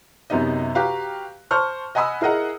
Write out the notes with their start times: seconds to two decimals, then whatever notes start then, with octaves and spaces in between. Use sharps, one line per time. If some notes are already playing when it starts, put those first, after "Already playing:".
0.30 F#2 C3 B3 D#4 D#5
0.75 F#4 G4 B4 F5 A#5
1.51 C5 A5 C#6 F6
1.95 D#5 F#5 G#5 B5 D#6 E6
2.21 E4 G#4 A#4 D#5 F#5